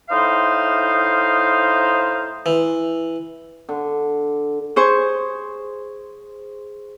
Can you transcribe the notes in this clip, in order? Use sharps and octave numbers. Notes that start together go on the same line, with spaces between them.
A2 D#4 C5 F5
E3
D3
G#4 C5 C#6